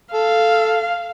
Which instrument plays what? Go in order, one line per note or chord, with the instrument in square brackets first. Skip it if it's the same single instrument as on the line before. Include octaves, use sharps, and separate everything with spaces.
[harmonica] A4 [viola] F5